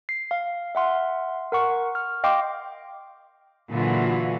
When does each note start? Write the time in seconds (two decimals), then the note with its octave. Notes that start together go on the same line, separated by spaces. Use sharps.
0.09 C7
0.31 F5
0.75 E5 F#5 C6 F6
1.52 A#4 F#5 C#6
1.95 F6
2.24 D#5 F5 G5 C6 D6
3.72 A#2 D3 E3 F#3 F4 F#4